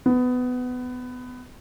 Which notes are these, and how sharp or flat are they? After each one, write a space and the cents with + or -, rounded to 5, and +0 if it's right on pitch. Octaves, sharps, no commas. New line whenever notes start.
B3 +20